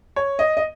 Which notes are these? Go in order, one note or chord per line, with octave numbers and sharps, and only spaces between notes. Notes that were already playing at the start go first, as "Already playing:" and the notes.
C#5
D#5
D#5